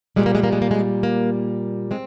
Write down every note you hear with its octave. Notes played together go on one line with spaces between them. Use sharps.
A#2 G3 G#3
A#3
G#3
A#3
G#3
A#3
G#3
A#3
G#3 C4